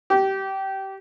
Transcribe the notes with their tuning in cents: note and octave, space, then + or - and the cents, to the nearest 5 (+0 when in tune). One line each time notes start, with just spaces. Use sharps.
G4 -20